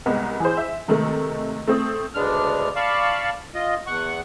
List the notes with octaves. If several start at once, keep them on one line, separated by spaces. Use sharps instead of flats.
C2 G#3 B3 A#4
E3 G#4 C5
E5
C3 D#3 G#3 A3
A3 C4 D#6
D2 C#3 G#3 B3 D4 F6
D5 F5 A5 B5 C#6
F4 D#5
E2 F#5 C#6